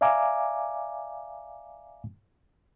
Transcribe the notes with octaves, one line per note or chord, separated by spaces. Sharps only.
D5 E5 F5 G#5 A#5 D6